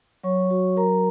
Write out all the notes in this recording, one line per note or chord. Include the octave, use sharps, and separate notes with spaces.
F#3 C#5 C#6
F#4
F#3 A#4 A#5